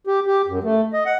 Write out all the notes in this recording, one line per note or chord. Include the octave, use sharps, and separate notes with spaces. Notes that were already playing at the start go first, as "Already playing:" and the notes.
G4
G4
F#2
A3
D#5
F#5